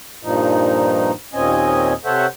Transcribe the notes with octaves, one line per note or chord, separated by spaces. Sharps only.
G2 A#2 F3 D#4
D#2 A#2 C4 C#4 D#5 G#5
C3 A4 C5 C#5 E5 F#5